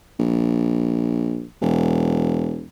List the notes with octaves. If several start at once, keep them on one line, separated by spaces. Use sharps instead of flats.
A#1
E1